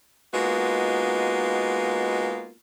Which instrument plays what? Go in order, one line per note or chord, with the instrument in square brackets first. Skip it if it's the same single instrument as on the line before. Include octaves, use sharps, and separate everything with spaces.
[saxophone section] G#3 A#3 B3 D#4 F4 F#4